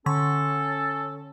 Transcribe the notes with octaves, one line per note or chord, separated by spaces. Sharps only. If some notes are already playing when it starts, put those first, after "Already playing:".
D3 C#4 A4 C#6